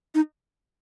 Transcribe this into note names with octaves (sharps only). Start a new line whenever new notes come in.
D#4